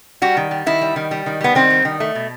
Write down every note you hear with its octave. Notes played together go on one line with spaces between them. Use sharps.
G3 F#4
D#3
G3
D#3 E4
G3
D#3
G3
D#3
G3 B3
D#3 C4
G3
D#3
A3
B2